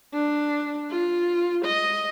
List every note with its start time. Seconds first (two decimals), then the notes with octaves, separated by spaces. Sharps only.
0.13 D4
0.91 F4
1.65 D#5